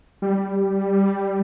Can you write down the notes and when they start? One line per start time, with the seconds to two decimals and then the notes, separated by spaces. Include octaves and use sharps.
0.22 G3